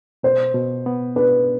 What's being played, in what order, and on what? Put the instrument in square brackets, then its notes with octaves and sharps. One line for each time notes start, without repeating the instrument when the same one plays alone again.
[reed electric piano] B2 [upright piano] C5
[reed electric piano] B2
B3
[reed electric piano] D4 [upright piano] B4